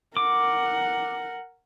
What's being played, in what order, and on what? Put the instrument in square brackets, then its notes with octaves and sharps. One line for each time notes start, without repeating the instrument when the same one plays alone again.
[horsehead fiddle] A#4 F#5 [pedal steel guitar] D6